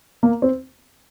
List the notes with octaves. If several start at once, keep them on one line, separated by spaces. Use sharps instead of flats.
A#3
C4